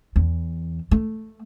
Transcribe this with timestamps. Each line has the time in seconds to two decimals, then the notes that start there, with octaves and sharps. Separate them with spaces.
0.16 E2
0.91 A3